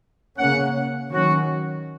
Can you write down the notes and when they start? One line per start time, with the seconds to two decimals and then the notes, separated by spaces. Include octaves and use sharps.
0.38 C#3 A#3 C#4 F#5
1.11 D#3 F#3 C#4 F#4